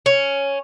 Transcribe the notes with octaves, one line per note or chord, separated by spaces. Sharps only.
C#4